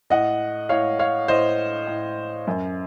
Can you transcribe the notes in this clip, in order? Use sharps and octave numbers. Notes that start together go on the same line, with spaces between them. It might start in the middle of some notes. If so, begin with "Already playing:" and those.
A2 D#5 F#5
A2 C#5 F5
C#5 F5
A2 C5 D#5
A2
F#2